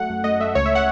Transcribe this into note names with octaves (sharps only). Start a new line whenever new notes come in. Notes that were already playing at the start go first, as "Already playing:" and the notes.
Already playing: F#3 A3 F#5
F#2
A3 D#5
A3 E5
C#2 C#5
E5
F#5